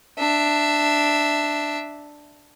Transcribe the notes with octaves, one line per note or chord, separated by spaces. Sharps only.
D4 E5